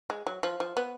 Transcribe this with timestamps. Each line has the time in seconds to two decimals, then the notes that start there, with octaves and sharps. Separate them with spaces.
0.10 G#3
0.27 F#3
0.43 F3
0.60 F3
0.77 B3